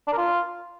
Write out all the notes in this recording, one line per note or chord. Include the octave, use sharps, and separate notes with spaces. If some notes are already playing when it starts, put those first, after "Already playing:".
D4
A#4
F4